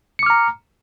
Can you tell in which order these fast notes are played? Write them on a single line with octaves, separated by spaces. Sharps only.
C#7 D6 F6 A#5